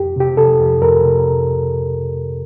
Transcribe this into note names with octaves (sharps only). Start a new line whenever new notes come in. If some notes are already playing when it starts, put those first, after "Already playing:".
Already playing: F2 G4
C3 G4
C3 A4
F2
F2 A#4
C3